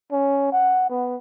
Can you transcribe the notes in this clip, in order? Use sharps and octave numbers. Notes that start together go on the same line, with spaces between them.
C#4
F#5
B3